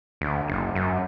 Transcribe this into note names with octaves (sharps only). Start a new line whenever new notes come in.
D2
F#1
F#2